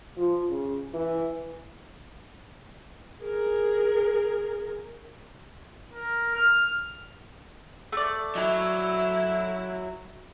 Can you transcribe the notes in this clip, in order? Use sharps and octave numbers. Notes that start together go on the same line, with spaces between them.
F3
C#3
E3
G#4 A#4
A#4
F6
A3 D5
F#3 E4